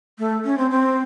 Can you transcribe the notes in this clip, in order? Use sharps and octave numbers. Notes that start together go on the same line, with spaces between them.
A3
C#4
C4
C4